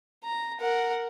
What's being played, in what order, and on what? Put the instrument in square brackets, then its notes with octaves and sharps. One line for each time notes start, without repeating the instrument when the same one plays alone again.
[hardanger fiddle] A#5
A#4 F#5